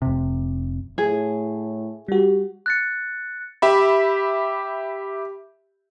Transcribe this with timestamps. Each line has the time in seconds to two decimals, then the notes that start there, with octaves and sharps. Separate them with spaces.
0.02 F1 C3
0.98 A2 G#4
2.08 G3 F#4 G4
2.66 F#6 A6 C#7
3.62 G4 E5 B5